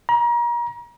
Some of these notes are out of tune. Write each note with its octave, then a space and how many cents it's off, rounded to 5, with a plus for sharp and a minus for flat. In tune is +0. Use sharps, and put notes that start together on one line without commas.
A#5 +35